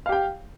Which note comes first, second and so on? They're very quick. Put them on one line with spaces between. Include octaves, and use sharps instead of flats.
F5 G4 G5